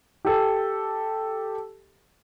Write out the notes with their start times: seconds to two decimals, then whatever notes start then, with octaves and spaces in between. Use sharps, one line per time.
0.25 G4 A4